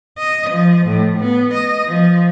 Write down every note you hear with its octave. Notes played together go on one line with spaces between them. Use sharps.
D#5
F3
A2
B3
D#5
F3